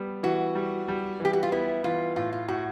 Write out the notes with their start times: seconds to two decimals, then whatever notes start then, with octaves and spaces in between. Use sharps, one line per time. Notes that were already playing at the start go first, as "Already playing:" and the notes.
Already playing: G3 B3
0.23 E3 F#4
0.55 G3
0.88 G3
1.20 E3
1.25 G4
1.33 F#4
1.43 F4
1.52 B3 E4
1.84 E3 F4
2.16 A2 F4
2.33 F4
2.48 A2 F#4